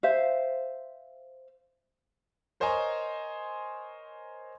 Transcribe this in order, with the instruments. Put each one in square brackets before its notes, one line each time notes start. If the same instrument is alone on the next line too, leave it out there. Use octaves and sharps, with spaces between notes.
[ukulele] C5 E5 F5
[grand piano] A#4 C5 C#5 D#5 G#5 A#5